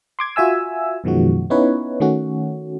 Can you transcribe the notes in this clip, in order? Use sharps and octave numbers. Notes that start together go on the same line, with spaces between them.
C6 D6 G#6
F4 F#4 E5 G#5 E6
F#2 B2 D#3 F3 G#3 F#4
B3 C#4 D#4 E4 B4 C#5
D#3 A3 C#4 F#4